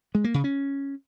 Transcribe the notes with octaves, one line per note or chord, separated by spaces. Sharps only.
G#3
A#3
C#3
C#4